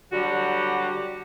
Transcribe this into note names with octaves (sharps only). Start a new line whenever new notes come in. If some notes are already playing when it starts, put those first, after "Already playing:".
D3 F#3 G3 F#4 G4